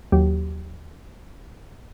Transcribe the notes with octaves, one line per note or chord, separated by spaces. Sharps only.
D#2 F#3 G4